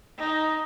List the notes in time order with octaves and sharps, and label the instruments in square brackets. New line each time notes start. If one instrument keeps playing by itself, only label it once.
[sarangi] D#4